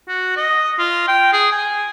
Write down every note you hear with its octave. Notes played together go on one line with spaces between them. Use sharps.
F#4
D#5
F4
G5
G#4
G#5